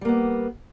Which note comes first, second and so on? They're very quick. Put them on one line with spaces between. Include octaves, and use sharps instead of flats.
G3 A#3 B3